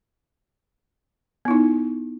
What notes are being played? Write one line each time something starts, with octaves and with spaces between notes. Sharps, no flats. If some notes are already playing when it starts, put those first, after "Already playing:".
B3 D#4 E4